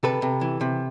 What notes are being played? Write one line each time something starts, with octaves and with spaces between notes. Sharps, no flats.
C3 A4 B4
C3
E3
C3